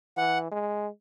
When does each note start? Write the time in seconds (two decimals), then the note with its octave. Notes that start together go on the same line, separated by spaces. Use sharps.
0.18 E3 F#5
0.52 G#3